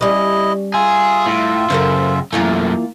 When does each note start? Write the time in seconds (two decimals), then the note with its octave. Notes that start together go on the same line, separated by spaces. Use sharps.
0.01 G3 C#4 E4 D#5
0.74 F4 G#4 E5
1.26 A2
1.70 F#2 C#3 A4 A#4 C5
2.33 F#2 E3 A3 A#3 F4